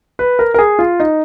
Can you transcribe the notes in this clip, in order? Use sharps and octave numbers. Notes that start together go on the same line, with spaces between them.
B4
A#4
A#4
G#4
F4
D#4